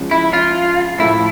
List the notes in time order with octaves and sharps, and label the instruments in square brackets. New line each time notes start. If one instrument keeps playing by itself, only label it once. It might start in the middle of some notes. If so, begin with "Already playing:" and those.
Already playing: [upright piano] C#2 C#3 F3 G#3 C#4
[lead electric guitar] E4
F4
[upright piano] A2 F3 A3 [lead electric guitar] E4